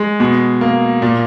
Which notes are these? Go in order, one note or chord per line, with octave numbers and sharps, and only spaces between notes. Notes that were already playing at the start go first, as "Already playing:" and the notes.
Already playing: G#3
B2
A#3
A#2